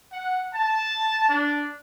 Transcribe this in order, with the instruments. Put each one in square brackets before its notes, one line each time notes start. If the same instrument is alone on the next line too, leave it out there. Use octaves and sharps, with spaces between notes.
[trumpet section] F#5
A5
D4